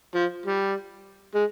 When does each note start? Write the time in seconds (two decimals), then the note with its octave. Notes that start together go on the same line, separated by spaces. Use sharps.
0.15 F3
0.46 G3
1.34 G#3